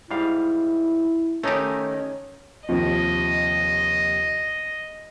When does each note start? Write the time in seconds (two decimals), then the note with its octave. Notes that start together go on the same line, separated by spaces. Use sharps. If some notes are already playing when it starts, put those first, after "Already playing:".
0.11 G#2 G3 E4 F5
1.43 D#3 A3 C#4 D#4 G4
2.69 D#2 C3 F3 D#5